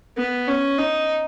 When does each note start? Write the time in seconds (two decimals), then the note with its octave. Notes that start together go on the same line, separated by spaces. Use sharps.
0.17 B3
0.49 C#4
0.79 D#4